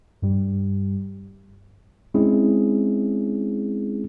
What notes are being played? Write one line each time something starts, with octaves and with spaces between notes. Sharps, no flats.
G2 G3
G#3 C4 C#4 E4 G#4